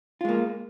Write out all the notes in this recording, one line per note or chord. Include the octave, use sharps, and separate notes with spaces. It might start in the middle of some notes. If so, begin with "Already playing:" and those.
G#3 A#3 F4